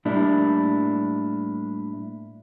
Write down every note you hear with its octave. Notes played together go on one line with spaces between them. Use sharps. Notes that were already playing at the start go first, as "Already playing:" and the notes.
A2 G3 A#3 D4 E4